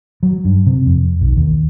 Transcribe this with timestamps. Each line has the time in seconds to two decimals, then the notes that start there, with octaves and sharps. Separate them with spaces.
0.23 F#3
0.45 G2
0.67 C3
0.86 F2
1.21 B1
1.37 D#2